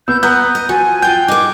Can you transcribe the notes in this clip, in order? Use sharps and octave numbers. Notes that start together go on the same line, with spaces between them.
B3 E6 G6
B3 A#5 D#6 F#6 G6
D#5
F3 F#4 G#5
F4 G5 G6
D#4 G#4 D6